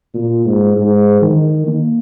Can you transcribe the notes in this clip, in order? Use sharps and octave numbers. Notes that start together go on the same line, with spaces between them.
A#2
G#2
G#2
D#3
A#3